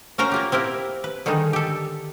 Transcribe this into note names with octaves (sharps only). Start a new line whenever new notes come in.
C#4 F#4 A#4 C5 A#5
A#3 F4 G4
C4 E4 G4 A#4
B4
D3 D#3 G3 G#3 D#4
G4 A4